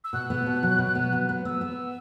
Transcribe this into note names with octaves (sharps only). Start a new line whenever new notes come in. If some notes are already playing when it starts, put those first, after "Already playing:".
E6
B2 F#6
B3
B2
F#3
B2
B3
F#3
B3
B3 E6
B3